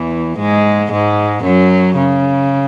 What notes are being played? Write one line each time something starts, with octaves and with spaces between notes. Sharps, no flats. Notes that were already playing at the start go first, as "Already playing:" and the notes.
Already playing: E2 E3
G#2 G#3
G#2 G#3
F#2 F#3
C#3